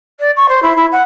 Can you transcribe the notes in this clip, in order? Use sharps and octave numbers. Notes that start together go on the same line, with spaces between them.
D5
C#6
C5
E4
E4
F#5